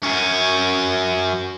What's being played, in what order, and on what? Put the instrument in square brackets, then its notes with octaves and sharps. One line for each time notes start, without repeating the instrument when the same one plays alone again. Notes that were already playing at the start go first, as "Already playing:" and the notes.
[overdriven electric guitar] F#2 C#4